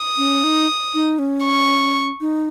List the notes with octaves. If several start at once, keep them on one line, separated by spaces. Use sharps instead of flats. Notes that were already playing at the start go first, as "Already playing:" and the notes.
Already playing: D#6
C#4
D#4
D#4
C#4
C#6
D#4